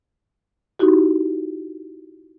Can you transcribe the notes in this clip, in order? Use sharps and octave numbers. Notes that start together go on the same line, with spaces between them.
D#4 E4 F#4 G4